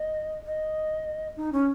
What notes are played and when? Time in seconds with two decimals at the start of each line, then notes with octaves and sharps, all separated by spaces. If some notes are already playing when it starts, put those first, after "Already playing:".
Already playing: D#5
0.46 D#5
1.37 D#4
1.53 C#4